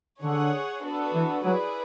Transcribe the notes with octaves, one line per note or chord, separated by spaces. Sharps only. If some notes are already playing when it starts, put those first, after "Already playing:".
D3 G#4 C#5 F#5
B3 D4 F#4 A4
E3
F#3 E4 G#4 B4 D5